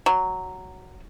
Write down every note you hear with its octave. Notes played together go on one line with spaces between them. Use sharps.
F#3